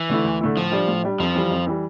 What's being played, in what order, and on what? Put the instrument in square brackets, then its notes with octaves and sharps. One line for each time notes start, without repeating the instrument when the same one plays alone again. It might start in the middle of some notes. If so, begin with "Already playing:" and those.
Already playing: [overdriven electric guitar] E3
[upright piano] D3 A3 E4
D2
D3 A3 E4
[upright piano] A2 [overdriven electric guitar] F3
[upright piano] G3 D4
A2
G3 D4
[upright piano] F2 [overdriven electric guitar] F3
[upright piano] E3 G3
F2
E3 G3